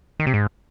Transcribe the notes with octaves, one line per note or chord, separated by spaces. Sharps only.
D#3
C3
G#2